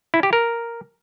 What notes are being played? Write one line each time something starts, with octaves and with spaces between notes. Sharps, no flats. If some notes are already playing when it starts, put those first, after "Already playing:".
E4
G4
A#4